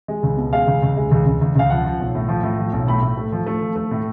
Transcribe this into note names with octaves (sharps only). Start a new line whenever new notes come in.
G#3
C#2
B2
G#3 F5
C#2
C#2
G#3
C#2
C#2
C#2
C#2 F5
F3 F#5
F3
B1
A2
F3
A2
F3
B1
A2 B5
A2
A3
F3
A3
F3
A3
A2